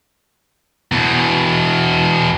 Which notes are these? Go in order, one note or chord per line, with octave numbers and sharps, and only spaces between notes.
E2 B2